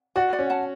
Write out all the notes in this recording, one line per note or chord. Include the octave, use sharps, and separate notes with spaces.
F#4 D5 F#5
D5 F#5
C#4
F#5 A5